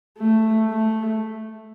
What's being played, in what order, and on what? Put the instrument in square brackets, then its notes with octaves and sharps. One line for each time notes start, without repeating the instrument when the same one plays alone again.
[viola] A3
A3